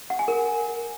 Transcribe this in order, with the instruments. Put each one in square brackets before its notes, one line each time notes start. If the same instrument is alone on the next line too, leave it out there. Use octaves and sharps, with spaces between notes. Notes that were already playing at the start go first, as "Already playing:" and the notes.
[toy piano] F#5
G#5
A#4